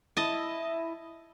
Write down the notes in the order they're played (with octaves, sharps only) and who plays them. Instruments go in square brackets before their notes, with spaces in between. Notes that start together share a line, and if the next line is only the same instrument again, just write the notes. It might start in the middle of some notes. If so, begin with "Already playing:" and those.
[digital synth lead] E4 [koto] D#5 A5